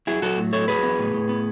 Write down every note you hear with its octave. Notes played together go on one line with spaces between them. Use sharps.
F#3 E4 G#4
F#3 F#4 A4
A2
F#3 A4 C#5
F#3 G#4 B4
B3
A2
A2
B3